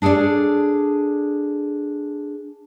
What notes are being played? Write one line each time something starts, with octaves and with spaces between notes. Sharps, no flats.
D4 G#4 A4 C#5 D5